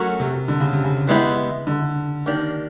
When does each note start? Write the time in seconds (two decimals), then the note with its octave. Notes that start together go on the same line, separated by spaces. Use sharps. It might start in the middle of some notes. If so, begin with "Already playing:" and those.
Already playing: F#3 A3 C#4 F#4 A#4
0.20 C3
0.48 D3
0.60 C#3
0.73 C3
0.84 C#3
1.07 E3 G#3 B3 E4 G4
1.67 D3
2.26 D#3 A#3 D4 G4